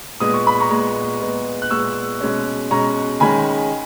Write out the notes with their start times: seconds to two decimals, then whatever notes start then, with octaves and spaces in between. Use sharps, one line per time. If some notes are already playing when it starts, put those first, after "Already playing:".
0.20 A#2 G#3 B3 D#6
0.34 C#6
0.47 B5
0.60 A#5 C#6
0.71 A#2 G#3 B3
1.21 A#2 G#3 B3
1.62 F#6
1.70 A#2 G#3 B3 C#6 E6
2.21 B2 G#3 C#4
2.71 B2 G#3 C#4 A#5 C#6
3.20 D#3 G#3 C#4 G#5 B5